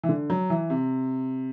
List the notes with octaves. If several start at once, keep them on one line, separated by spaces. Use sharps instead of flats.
E3
D3
F#3
E3
C3